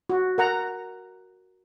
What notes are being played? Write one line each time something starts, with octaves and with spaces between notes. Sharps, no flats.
F#4
A#4 F#5 A#5